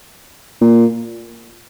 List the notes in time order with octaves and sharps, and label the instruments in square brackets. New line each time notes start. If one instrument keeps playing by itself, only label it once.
[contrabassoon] A#2